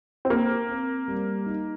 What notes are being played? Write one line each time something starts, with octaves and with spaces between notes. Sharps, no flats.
C4
A#3 A#4
C4
G3
D#4